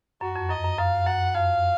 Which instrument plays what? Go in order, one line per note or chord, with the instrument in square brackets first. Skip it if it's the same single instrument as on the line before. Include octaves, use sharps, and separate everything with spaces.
[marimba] F#2 [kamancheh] F#4
[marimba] F2
[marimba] F#2 [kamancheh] D#5
[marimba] F#2
[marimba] F#2 [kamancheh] F5
[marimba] F#2 [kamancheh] F#5
[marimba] F2 [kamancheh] F5